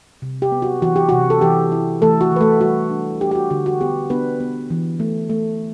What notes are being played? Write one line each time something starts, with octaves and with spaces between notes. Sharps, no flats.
C3
G4
B3
F#4
E3 F#4
G4
C3 F#4
A4
E3 G4
E4
E3 A3 A4
F#4
E3 B4
A3 A4
G3 F#4
D4
D4 G4
G4
F#4
D3 F#4
F#4
B3 G4
B3 D4 B4
B3
E3
A3
A3